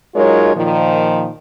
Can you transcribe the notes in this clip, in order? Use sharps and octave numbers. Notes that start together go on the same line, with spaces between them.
F#3 G#3 D#4 F4 A#4 C#5
A#2 D#3 F3